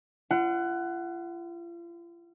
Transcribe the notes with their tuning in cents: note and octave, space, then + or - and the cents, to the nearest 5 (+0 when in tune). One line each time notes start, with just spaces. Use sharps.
F4 -40 F#5 +15